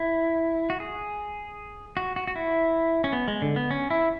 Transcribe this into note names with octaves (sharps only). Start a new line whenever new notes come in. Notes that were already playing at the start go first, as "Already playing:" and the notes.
Already playing: E4
F#4
G#4
F#4
F#4
F#4
E4
C#4
B3
G#3
D3
B3
C#4
E4